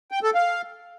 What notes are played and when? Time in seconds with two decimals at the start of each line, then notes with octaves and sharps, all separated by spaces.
0.11 G5
0.23 A4
0.35 F5